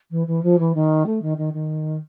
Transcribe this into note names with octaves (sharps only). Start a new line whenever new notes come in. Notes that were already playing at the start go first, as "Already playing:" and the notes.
E3
E3
F3
E3
D#3
A3
D#3
D#3
D#3